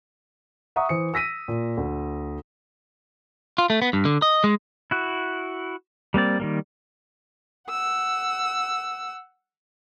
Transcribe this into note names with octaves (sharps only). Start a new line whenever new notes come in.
E5 F#5 A#5 C#6 D#6
E3 C5 C#7
E6 A#6 B6 D#7
A#2
D2
F4
A3
B3
G2
D3
D#5
G#3
E4 F#4
G3 A#3 C4 D5
D#3 G3 A#3
F#5 E6